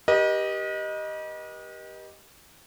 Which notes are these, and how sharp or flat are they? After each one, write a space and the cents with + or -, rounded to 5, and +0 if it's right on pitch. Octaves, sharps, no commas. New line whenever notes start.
G4 +0 B4 -45 D#5 +0